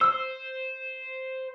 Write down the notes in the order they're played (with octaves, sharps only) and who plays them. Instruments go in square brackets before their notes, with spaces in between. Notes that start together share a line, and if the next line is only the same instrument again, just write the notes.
[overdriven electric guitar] C5 [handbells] E6